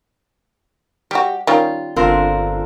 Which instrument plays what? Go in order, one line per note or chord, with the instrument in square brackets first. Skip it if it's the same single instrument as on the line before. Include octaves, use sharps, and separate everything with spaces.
[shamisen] G3 F#4 [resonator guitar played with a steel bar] G4
[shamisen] D#3 G3 C#4 [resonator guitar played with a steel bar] F4
[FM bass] G1 [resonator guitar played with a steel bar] C4 D4 A#4 [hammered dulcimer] F4 A4